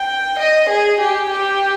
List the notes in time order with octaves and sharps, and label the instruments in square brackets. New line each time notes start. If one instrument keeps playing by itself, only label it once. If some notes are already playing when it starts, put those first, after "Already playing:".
Already playing: [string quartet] G5
D#5
G#4
G4
G4